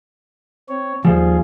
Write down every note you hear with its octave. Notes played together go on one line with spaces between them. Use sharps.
C4 C#5
D#2 F3 G3 F4 G#4 C5